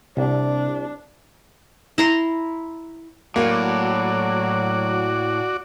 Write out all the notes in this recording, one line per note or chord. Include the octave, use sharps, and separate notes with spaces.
C2 C3 D4 G4
E4 A#5 C6
A2 F#3 A#3 F#4 D5